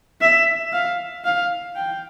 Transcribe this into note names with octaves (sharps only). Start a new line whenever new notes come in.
E5
F5
F5
G5